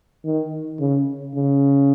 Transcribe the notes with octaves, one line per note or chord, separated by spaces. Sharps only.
D#3
C#3
C#3